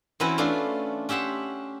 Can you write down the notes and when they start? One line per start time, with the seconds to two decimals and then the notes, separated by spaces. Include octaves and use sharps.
0.20 E3 C4 C#4 E4 F#4 B4
0.38 A3 C#4 D4 F4
1.09 C#4 G4 E5 F#5 C6